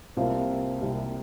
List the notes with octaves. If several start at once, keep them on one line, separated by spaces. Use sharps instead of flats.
C2 C3 G3 A#3 C4 F4
C2 C3 G3 A#3